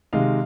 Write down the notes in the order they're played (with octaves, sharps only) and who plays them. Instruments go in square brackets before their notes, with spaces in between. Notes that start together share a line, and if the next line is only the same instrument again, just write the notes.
[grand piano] C3 D#3 G#3 D#5 F5